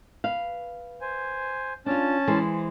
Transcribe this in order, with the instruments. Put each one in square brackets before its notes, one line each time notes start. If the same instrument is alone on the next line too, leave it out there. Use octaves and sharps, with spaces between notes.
[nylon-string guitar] B4 F5
[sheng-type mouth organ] C5 G#5
[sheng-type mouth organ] C#4 A5 [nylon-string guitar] D4 F4
[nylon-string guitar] E3 G#3 C5